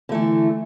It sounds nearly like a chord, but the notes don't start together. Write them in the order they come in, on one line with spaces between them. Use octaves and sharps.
D3 A3 E3